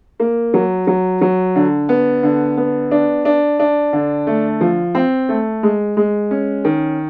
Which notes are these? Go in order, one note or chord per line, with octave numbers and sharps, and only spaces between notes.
A#3
F#3
F#3
F#3
D3
B3
D3
B3
D4
D4
D4
D3
A3
F3
C4
A3
G#3
G#3
C#4
D#3